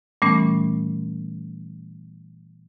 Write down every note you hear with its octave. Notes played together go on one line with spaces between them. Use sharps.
A#2 E3 G3 A3 B3 C#4